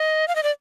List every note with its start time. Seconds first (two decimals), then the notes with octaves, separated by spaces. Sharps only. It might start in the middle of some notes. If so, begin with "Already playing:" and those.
Already playing: D#5
0.28 F5
0.36 D#5
0.43 D5